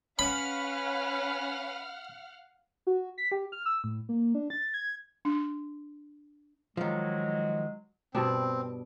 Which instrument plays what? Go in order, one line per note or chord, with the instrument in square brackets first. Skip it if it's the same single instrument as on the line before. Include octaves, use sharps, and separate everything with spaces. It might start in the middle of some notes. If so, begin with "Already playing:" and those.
[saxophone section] C#4 [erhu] B4 [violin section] F5 F#5 F6 [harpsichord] B5
[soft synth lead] F#4
B6
G4
F6
E6
A2
A#3
D4
A6
G#6
[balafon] D4
[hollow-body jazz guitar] D#3 F3 [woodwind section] F#3 G#3
[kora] G2 B2 D4 [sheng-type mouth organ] C4